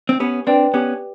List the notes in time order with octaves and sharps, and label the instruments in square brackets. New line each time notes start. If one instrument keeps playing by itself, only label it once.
[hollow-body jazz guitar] C4
[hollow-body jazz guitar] B3 C#4 [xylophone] G4
[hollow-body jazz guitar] C4 D4 [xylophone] B4 D5 G5
[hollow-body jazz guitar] B3 C#4 [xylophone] G4